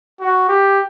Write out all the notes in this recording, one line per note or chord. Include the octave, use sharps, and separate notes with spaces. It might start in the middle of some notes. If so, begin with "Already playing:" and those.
F#4
G4